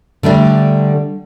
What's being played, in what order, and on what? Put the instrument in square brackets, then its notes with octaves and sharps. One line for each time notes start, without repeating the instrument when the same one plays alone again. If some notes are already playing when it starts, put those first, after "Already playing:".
[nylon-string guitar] D3 G3 A3 D4